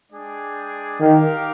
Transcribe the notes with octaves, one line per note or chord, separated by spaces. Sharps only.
G#3 D4 G#4 D5 G5
D#3 D#4 G4 A#4 F5